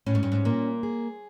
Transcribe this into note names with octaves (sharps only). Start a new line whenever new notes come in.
A2 C#4
G#2
G2
G#2
A#2 A#3
G#4